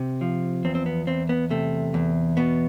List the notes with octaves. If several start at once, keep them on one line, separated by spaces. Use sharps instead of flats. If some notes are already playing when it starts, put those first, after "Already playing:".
Already playing: C3
F3
E2 C4
C4
B3
E2 C4
B3
C3 A3
E2
B2 B3